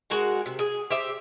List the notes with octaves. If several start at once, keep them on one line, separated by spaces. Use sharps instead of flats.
G#3 F#4 A#4 F#5
C3
G#4
G4 C5 E5